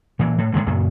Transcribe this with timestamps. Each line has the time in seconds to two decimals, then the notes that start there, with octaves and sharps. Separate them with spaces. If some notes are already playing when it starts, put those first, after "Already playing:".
0.19 A#2 E3
0.38 A2
0.54 A2 D3 D#3 G#3
0.67 F#2 A#2 C#3